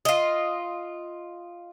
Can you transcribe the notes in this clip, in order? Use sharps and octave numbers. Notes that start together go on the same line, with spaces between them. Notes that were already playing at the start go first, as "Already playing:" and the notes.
F4 D#5